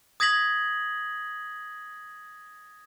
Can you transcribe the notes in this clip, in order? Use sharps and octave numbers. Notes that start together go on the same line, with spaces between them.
D#6 G#6 A#6 B6 F#7